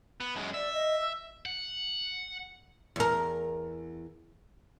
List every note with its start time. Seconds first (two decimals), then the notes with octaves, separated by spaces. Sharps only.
0.21 B3
0.35 F#2 G#3
0.54 D5 E5
0.74 D#5
1.01 E6
1.46 F#5
2.96 E2 A#4